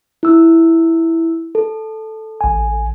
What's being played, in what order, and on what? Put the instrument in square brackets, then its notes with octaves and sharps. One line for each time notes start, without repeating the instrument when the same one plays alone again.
[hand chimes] E4 E6
A4
[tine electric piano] A1 G#5